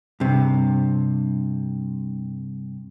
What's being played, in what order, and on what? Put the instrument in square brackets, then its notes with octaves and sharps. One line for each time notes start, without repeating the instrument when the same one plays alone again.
[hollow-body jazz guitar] G2 C3